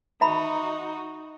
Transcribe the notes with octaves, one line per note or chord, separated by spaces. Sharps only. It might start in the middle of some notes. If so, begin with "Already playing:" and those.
D#4 F#4 E5 A#5 B5